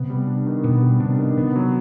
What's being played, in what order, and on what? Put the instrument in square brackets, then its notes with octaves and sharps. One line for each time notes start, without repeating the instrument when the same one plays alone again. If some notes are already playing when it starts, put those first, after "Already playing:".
Already playing: [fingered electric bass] C3 [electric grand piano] B3
[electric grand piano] G3
D4
D#3
[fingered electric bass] B2 [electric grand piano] B3
[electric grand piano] G3
[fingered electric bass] C3 [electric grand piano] D4
[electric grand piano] D#3
[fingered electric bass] C3 [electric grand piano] B3
[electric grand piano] F#3